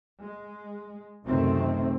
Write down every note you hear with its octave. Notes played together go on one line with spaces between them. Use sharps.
G#3
C#2 F#2 C3 D#3 A3 C4